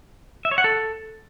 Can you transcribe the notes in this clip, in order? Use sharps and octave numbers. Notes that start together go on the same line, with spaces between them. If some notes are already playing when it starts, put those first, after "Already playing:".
E5
C#5
F#5
A4